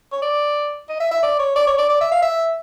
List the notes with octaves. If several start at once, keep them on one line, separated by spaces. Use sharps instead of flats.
C#5
D5
D#5
E5
E5
D5
C#5
D5
C#5
D5
D5
E5
F5
E5